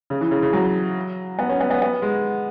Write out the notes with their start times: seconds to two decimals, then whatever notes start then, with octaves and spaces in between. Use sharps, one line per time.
0.10 C#3
0.21 E3
0.31 C#3
0.42 C#3
0.53 F#3
1.39 B3
1.49 C#4
1.60 B3
1.70 B3
1.82 B3
2.02 G#3